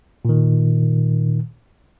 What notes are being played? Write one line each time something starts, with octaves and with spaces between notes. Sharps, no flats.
A#2 D#3